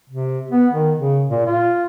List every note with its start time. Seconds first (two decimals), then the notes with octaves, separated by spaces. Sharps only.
0.10 C3
0.51 B3
0.72 D#3
0.97 C#3
1.29 A#2
1.46 F4